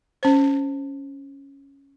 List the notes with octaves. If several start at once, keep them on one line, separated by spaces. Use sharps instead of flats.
C#4 C5